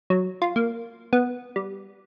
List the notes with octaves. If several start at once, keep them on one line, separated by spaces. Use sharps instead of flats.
F#3
F4
A#3
B3
G3